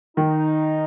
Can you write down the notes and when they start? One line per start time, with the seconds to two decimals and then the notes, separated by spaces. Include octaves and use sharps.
0.17 D#3 D#4